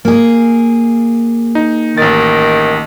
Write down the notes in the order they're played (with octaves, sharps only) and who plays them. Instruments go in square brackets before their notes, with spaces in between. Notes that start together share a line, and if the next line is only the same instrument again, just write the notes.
[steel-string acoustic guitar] A#3 G#4
[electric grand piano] D#4
[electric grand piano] A1 A6 [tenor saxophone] D#3